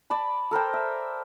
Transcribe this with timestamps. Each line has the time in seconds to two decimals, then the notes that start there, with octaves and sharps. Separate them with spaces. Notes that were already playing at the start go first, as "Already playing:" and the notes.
0.10 D5 A5 B5
0.51 A4 A#4 C5 G5
0.74 E5